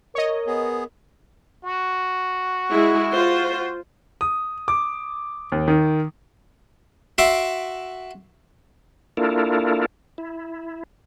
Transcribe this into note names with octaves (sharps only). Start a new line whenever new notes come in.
A#4 C#5 D#5
B3 G#4
F#4
G#3 E4
F4 C5
D#6
D6
D#2
D#3
F#4 E5 C6 D6
A#3 D4 E4 F4 A4 A#4
E4